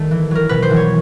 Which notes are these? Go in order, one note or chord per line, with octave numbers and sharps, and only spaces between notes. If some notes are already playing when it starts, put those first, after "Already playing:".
Already playing: D#3 G3 A3
E3
F#3 A#4
B2 B4
C5
E3
C#5